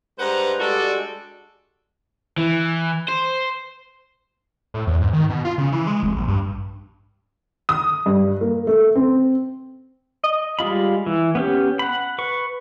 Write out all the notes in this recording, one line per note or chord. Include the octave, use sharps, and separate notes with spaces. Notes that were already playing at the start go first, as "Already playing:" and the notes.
G2 G#3 B4 C5 F#5 A#5
G3 G#3 D4 F#4 A4 D5
E3
C5
A2
E2
G#2
D#3
B2
F4
C#3
E3
G#3
F1
A#1
G2
D#6
G2
A#3
A3
C4
D#5
G3 G#3 F4 B5
E3
B3 C#4 G4
F#5 B5
B4 C#6